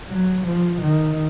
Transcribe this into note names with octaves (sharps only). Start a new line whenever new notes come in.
F#3
F3
D#3